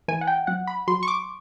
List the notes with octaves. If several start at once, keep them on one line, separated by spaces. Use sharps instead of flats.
E3 G#5
F#5
G5
F#3 F#5
B5
F#3 C6
C#6
D6